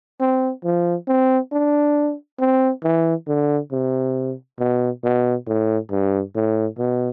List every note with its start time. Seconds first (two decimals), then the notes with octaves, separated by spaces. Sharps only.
0.21 C4
0.64 F3
1.08 C4
1.53 D4
2.40 C4
2.84 E3
3.28 D3
3.72 C3
4.59 B2
5.04 B2
5.47 A2
5.91 G2
6.36 A2
6.79 B2